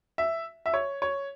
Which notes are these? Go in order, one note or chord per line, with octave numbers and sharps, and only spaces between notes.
E5
E5
C#5
C#5